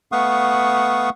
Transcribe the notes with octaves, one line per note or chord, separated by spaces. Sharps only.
A3 B3 F5 F#5 C#6 D#6